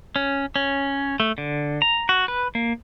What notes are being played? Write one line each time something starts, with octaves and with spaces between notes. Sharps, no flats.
C#4
C#4
A3
D3
A#5
F#4
B4
A#3